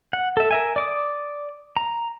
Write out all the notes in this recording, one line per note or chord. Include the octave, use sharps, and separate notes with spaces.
F#5
A4 E5
A#4 E5 G#5
D5 D6 D#6
A#5